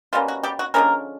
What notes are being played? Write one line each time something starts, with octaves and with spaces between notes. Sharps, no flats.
B2 G3 A#3 C#4 F4
F#4
G3 G4
F#4
D3 F3 G#3 A#3 C#4 A#4